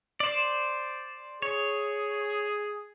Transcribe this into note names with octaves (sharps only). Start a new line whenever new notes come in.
C5 D5
G#4 C#5